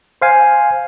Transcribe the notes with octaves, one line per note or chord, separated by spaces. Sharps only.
C5 F5 G#5